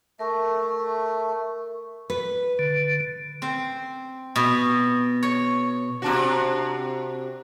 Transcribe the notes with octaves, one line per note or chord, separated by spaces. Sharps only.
A3 A#4 C#6
B4
D3
C4
B2
C#5
C3 D4 F#4